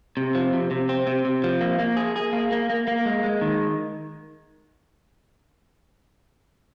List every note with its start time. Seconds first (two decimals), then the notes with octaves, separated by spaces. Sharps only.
0.17 C3
0.35 F3
0.53 C3
0.71 C3
0.89 C4
1.07 C3
1.25 C3
1.44 F3
1.61 A#3
1.79 A#3
1.97 G#4
2.16 G#4
2.33 A#3
2.52 A#3
2.70 A#3
2.87 A#3
3.05 G#3
3.24 G#3
3.41 D#3